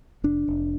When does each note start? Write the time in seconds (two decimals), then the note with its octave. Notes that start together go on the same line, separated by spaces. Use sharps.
0.24 F1 D4
0.48 F1